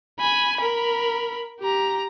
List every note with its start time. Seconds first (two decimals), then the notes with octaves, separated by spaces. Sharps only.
0.19 G#5 B5
0.57 A#4 B5
1.60 G4 A#5